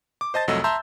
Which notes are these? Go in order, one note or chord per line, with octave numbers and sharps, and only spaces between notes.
D6
C5 D#5 A5 A6
C2 F2 F#3 A3 D#5 E6
E5 A5 A#5 C6 E6 G6